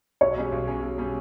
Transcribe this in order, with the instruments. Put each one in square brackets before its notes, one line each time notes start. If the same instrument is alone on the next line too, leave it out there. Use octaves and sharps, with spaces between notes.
[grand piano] B1 [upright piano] C#5
[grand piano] B2 G3 C#4 G#4
B1
B2 G3 C#4 G#4
B1
B2 G3 C#4 G#4